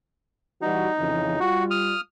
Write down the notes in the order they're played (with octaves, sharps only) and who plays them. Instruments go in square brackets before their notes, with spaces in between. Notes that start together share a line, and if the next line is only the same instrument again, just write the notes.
[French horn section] E3 G3 F#4 [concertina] D#4
[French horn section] F2 C#3 E3
[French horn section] G3 F4 [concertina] F#4
[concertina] D#6 F6